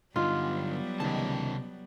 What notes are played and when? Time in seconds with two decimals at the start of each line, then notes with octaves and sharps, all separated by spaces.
0.16 G2 D3 F#3 G3 B3 D#4 F4
1.00 C#2 C3 D#3 A5